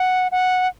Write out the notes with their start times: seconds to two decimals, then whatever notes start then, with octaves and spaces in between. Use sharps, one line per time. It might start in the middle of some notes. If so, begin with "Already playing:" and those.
Already playing: F#5
0.32 F#5